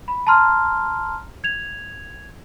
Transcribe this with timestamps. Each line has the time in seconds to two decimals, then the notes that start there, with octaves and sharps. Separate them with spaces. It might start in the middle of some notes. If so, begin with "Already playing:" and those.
0.08 B5
0.27 A5 A#5 C6 F6
1.44 G#6 F7